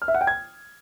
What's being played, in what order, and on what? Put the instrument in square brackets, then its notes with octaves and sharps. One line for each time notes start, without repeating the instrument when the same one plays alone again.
[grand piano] F6
E5
F#5
G5
G#6